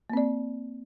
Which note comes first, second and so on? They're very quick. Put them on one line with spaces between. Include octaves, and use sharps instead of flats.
A#3 C4 D5